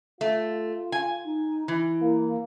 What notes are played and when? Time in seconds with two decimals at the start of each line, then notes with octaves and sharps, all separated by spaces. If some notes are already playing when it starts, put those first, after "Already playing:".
0.21 A3 F4
0.92 G#5
1.24 D#4
1.68 E3 E4
2.02 A#3